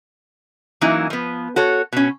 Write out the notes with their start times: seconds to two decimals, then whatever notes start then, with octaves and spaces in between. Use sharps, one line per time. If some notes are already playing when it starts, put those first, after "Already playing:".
0.81 E3 F#3 A#3 C#4 D#4 E4
1.10 F3 B3
1.56 F#4 A4 C#5
1.93 B2 C#4